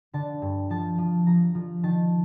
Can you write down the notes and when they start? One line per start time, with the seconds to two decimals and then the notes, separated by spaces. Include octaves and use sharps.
0.13 D3 A5
0.42 G2
0.70 F3 A5
0.98 F3
1.27 F3 A#5
1.55 F3
1.83 D#3 A5